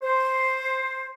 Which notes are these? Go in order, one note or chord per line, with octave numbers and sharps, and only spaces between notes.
C5